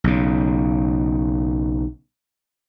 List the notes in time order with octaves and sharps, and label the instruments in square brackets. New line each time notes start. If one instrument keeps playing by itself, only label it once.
[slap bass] B1 C#3